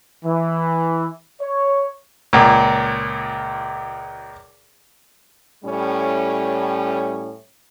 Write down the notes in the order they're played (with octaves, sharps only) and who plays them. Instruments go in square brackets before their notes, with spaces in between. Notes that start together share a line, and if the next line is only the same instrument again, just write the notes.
[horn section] E3
C#5
[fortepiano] C#2 A#2
[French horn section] A2 G3 C#4